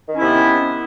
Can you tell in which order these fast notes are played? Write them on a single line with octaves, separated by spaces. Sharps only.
D#3 C#4 E4 C3 B3